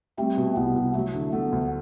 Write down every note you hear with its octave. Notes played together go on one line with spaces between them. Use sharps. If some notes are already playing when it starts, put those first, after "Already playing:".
G3 A3 C4
B2
C2 B3
C2
F#3 A3
D3
A3 B3
D2